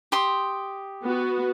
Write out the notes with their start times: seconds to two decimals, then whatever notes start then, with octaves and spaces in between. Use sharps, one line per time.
0.12 G4 C6 D#6
1.03 B3 F#4